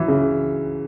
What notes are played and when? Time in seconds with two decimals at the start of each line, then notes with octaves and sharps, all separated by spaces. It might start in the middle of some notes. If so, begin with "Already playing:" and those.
Already playing: E3 F#3
0.08 C#3